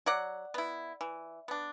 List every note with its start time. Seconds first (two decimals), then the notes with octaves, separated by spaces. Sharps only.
0.06 F#3 D5 F#5
0.54 B3 E4
1.01 E3
1.48 B3 D4